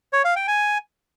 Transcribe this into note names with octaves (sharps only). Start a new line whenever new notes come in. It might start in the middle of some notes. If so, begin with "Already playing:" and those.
C#5
F5
G5
G#5